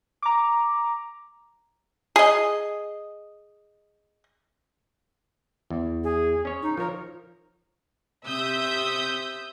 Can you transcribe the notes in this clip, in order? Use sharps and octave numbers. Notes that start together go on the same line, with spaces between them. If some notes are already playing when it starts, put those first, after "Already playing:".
A#5 D6
G#4 D#5
E2
G#4
C#4 C#5
D#4
F3 A#4 C#5
C3 E5 D#6 E6 G6